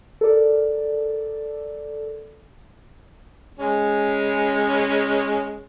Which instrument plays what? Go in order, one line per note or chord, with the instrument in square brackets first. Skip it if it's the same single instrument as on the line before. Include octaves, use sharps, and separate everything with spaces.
[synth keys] A4 A#4 D5
[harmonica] G#3 C#4